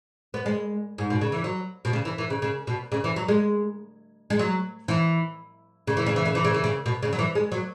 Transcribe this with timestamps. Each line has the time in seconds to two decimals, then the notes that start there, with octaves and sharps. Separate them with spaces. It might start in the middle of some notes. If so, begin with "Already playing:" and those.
0.34 B3
0.46 G#3
0.98 G#2
1.10 B2
1.21 C#3
1.32 E3
1.44 F#3
1.85 B2
1.93 C#3
2.05 E3
2.18 E3
2.30 C#3
2.42 C#3
2.67 B2
2.92 C#3
3.04 E3
3.16 F#3
3.28 G#3
4.30 G#3
4.39 F#3
4.88 E3
5.87 C#3
5.97 E3
6.06 C#3
6.16 E3
6.26 C#3
6.35 E3
6.45 C#3
6.54 E3
6.64 C#3
6.86 B2
7.03 C#3
7.13 F#3
7.19 E3
7.35 G#3
7.52 F#3